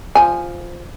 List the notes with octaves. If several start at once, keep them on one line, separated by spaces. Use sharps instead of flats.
F3 G#5